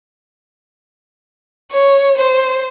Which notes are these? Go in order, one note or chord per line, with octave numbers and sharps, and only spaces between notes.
C#5
C5